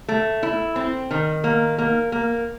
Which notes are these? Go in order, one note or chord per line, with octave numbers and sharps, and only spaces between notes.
A3
E4
C4
D#3
A#3
A#3
A#3